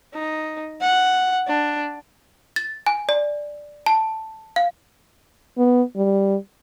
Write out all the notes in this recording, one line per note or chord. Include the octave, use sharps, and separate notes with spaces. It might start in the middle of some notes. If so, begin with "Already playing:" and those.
D#4
F#5
D4
A6
G#5
D5
A5
F5
B3
G3